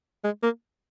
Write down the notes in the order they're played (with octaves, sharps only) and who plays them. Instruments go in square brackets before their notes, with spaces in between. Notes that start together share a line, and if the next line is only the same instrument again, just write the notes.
[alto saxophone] G#3
A#3